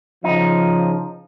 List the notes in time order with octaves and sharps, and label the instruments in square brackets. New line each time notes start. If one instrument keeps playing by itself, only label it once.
[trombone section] C#3 F3 [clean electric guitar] D#4